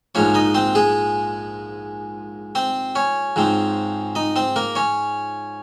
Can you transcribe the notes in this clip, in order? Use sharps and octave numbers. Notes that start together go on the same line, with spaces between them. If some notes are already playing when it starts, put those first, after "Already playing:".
A#1 G#2 F3 C#4 C#5
D#4 D#5
C4 C5
G#3 G#4
C4 C5
C#4 C#5
G#2 F3 C4
D#4 D#5
C4 C5
A#3 A#4
C#4 C#5